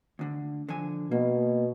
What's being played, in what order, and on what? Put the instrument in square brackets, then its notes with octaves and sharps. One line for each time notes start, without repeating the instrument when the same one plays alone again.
[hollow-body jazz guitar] D2 D3
D3 F3 G#5
[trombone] B2 [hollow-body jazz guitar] A#3